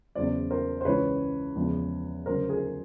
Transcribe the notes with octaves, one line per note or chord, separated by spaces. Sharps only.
E2 C#3 F#3 C5 D5
A#4 C5
C5
C#2 C#3 E3 G#3 B4 C#5
E2 C#3 F3 G#3
D2 C#3 F#3 A#4 C5
G#4 A#4